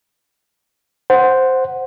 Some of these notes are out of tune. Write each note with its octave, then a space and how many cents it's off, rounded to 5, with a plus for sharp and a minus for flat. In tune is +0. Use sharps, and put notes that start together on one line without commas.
C5 +0 F#5 +0